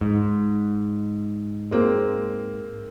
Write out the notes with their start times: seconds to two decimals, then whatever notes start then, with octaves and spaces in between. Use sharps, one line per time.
0.01 G#2
1.71 G#3 A#3 C4